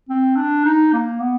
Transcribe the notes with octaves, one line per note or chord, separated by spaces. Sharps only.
C4
D4
D#4
A#3
B3